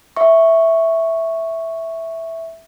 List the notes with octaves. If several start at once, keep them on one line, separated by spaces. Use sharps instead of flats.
E5 C#6